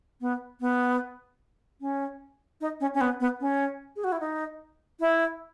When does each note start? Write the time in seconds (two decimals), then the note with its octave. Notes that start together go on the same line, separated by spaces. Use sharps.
0.21 B3
0.61 B3
1.81 C#4
2.61 D#4
2.80 C#4
2.94 C#4
3.01 B3
3.20 B3
3.41 C#4
3.96 G#4
4.04 F#4
4.12 E4
4.20 D#4
5.00 E4